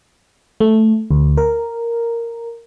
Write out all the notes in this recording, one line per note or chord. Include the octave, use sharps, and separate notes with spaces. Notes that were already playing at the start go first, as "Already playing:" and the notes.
A3
D2
A#4